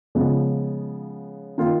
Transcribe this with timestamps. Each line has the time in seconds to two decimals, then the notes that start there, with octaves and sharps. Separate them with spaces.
0.15 C#3 F3 G#3 B3
1.58 D#3 A#3 F4